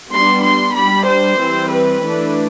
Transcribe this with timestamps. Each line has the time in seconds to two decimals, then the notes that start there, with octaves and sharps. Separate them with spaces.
0.11 G3 B3 D4 C6
0.43 C6
0.75 G3 D4 B5
1.07 C5
1.39 E3 G3 C4
1.71 B4
2.03 E3 A3 D4